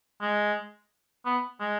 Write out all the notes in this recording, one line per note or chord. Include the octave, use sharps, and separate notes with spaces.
G#3
B3
G#3